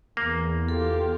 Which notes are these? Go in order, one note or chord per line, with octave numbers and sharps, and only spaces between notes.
E2 A#3
F4 G4 A4